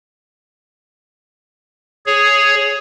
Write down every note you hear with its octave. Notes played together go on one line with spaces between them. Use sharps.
G#4 C#5